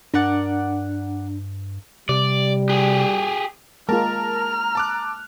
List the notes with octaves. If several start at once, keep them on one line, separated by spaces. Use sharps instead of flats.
G2 D4 A#4 D5 F#5
C3 G3 D5
G4 G#4
G#3 A#3 F4 A#4 A5 A#5 F6
A5 D6 F#6